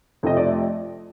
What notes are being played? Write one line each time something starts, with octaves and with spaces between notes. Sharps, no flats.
F1 F2 C3 F3 A3 D#5
D5